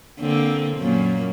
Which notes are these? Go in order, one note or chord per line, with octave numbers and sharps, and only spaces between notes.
D3 A#3 C4
F#2 A#2 A#3